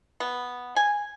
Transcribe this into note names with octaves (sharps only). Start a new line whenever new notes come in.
B3
G#5